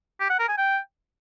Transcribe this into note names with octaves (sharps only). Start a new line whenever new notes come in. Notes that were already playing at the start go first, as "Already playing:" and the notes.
G4
F#5
A#4
G#5
G5